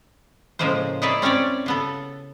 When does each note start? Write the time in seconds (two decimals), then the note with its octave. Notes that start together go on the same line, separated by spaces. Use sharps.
0.59 A2 C#3 F3 G#3 A#3 C5
1.02 D#4 E4 G#4 C#5 D5 E5
1.22 C4 C#4 G4 C#5 D5
1.66 C#3 B3 A4